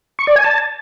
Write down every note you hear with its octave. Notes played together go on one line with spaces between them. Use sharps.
C#6
D5
G#5
A5